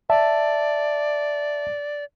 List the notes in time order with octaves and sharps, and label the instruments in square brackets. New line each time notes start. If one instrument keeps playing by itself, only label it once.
[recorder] D5 [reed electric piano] E5 A5